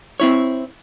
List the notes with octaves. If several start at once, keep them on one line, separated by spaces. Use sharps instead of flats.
C4 E4 C#5